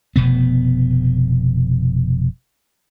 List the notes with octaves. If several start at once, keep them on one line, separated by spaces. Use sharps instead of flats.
F1 B2 B3